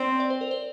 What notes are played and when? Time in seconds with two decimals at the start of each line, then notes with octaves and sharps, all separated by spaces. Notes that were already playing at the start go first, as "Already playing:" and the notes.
Already playing: C4 D5
0.20 D5
0.30 C5
0.41 A#4
0.51 C5